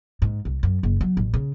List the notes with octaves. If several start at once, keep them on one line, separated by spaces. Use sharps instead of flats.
G#2
C2
F#2
F#1
F#3
A1
C#3